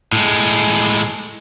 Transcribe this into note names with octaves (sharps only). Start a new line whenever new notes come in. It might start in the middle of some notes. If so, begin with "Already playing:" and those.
A2 G#3